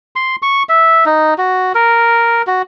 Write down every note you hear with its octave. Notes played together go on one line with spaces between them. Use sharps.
C6
C#6
E5
D#4
F#4
A#4
F#4